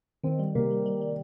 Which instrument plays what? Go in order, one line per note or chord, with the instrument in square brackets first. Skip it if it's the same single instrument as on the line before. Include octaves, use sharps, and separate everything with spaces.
[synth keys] D#3 [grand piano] C4
[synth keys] G3
[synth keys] C3 [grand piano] A#3
[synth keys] G3
G3
G3